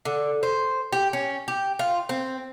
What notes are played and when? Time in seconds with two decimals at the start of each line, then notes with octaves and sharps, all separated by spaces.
0.05 D3
0.43 C5
0.93 G4
1.13 C#4
1.48 G4
1.79 F4
2.09 C4